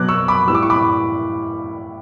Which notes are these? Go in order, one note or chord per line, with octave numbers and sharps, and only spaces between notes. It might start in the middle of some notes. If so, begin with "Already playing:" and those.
Already playing: B2 F#3 B3 D6 F#6
C#6 E6
B5 D6
A2 G3 B3 E6
D6
C#6
B5 D6